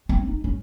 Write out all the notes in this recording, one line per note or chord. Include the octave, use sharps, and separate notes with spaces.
C4
D#4
C#4